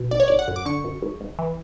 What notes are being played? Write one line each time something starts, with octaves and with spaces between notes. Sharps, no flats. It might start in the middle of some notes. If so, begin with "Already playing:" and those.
Already playing: B2
G#1 D5
C#5
G#1 D5
F#5
F#2
D6
D3 C#6
F#2
G#1
G#1
E3